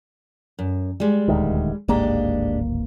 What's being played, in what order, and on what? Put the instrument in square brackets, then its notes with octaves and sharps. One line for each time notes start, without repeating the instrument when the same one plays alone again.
[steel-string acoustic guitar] F#2
G3 G#3
[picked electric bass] D#1 D2 D#3
[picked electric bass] D1 G#1 A#3 [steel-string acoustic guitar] G#3 D4 G4